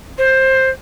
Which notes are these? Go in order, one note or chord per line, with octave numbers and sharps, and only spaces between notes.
C5